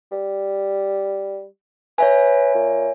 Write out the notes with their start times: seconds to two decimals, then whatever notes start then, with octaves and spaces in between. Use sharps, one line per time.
0.12 G3
1.98 B4 C#5 E5 G#5
2.55 A#2